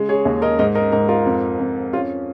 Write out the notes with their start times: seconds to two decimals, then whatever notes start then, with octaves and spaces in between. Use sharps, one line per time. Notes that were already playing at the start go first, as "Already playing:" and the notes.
Already playing: C#3 G#3
0.09 G#4 C#5
0.25 D#2
0.42 A#4 D#5
0.59 G#2 A#4 D#5
0.75 A#4 D#5
0.92 G#2 A#4 D#5
1.08 F4 A#4
1.26 F2
1.60 F2
1.93 C#4 F4